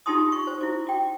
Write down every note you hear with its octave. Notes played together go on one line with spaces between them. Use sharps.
D#4 F4 G4 A5 C6 D#6
C#6
C5
E4 F#4
F#4 G5